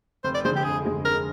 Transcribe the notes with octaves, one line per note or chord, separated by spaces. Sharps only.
F1 C5
D5
F2 D3 G#3 C5
G4
F1 G#4
F2 D3 G#3
F1 A#4